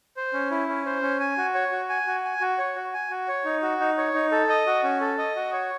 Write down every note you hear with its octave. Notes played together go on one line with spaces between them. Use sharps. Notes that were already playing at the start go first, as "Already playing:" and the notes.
C5
C#4
E4
C#4
C5
C#4
G#5
F#4
C#5
F#4
G#5
F#4
G#5
F#4
C#5
F#4
G#5
F#4
C#5
D#4
F#4
D#4
C#5
D#4
A4
D#5
F#4
C#4
A4
D#5
F#4
C#5